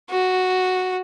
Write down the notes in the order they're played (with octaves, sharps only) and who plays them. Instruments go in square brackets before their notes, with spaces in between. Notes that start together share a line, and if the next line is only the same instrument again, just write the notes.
[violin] F#4